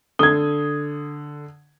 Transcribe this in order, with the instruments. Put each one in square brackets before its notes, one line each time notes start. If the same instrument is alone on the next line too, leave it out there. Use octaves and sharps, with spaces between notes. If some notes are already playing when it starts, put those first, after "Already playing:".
[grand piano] D3 G7 [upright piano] D#6 G#6